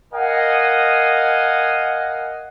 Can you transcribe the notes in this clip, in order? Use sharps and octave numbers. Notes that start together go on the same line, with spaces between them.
A#4 D#5 F5 F#5 G#5